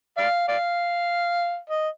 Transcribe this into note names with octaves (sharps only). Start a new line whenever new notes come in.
D5 F5
D5 F5
D#5